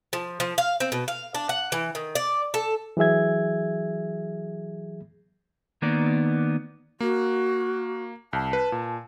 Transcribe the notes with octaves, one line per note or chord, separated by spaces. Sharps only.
F3
F3
F5
C4
B2
F5
D4
F#5
E3
D#3
D5
A4
E3 F#3 G#4 E5 G#6
D#3 A#3 B3 D#4 D5
A#3 F#4
C2 A5
B4
A#2